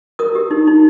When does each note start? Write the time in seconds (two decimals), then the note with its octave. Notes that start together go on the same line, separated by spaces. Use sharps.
0.19 A#4 D#6
0.35 G4
0.51 D#4
0.67 D#4